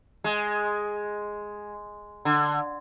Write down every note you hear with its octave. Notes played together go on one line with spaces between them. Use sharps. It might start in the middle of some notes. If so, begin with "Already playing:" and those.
G#3
D3